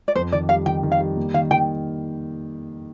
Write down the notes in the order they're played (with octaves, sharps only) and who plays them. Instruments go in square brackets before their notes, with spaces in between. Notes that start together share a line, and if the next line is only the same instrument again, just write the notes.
[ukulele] D5
[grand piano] F2 [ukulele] C5
[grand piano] D#3 [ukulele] D5
[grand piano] G3 [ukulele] F5
[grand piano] D#3 [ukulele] G5
[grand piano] D#3
[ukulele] F5
[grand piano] G3
A#3
[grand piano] D#3 [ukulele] F5
[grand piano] D#3 [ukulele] G5